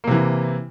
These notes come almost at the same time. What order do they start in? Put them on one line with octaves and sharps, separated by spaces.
A#3 C3 E3